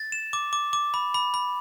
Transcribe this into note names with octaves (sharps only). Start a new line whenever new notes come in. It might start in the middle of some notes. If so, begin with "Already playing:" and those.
Already playing: A6
E7
D6
D6
D6
B5
B5
B5